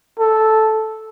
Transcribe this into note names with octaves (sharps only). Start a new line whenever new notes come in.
A4